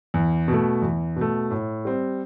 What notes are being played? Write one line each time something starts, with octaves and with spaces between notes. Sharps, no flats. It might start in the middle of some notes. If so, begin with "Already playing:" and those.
E2
B2
A3
E2
B2 A3
A2
G3 C4